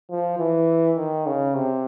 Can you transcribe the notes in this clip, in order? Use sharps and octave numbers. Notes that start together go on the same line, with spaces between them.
F3
E3
D#3
C#3
C3